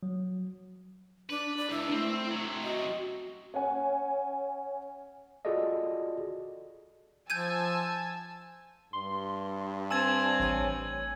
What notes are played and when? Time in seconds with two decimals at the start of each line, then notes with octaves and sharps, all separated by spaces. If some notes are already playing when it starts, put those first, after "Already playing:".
0.03 F#3
1.30 D4 B4
1.57 D5
1.71 C#2 D4 E4
1.91 A3 C4
2.31 C3 F#3
2.63 F#4 D#5
3.54 C#4 F#5 G#5
5.45 F4 F#4 G#4 A4 D5 D#5
7.30 F3 G#5 A5 E6 G6 G#6 D#7
8.93 G2 C6
9.91 C4 D5 G#5 A5 E6 G#6
10.40 A1 C#5 G#5